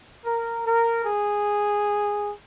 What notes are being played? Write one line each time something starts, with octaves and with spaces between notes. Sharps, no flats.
A#4
A#4
G#4